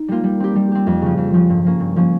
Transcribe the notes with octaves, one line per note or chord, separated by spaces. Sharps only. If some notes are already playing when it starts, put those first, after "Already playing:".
Already playing: D#4
G3 A#3 F4
G3
C4 G4
G3
C4 G4
F2
C#3 F3
F2
C#3 F3
G2
F3 A#3 C#4
G2
F3 A#3 C#4